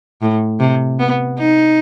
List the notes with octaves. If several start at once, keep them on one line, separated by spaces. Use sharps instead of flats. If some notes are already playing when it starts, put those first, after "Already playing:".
A2
C3
B3
D#4